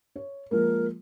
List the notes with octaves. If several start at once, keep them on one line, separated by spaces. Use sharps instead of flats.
C#5
F3 G#3 A#3 A#4